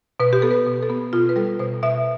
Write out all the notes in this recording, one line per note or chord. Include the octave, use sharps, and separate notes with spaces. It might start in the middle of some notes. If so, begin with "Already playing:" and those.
B2 B4
G4
B3 A4
B4
B2
A4
B3
B2 F4
B4
G3 A4
B2 C5
B2 E5